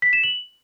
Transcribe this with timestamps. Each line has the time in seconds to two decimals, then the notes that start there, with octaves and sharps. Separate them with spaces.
0.02 B6
0.13 E7
0.23 F#7